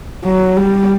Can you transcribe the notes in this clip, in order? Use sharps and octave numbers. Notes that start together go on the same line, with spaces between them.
F#3
G3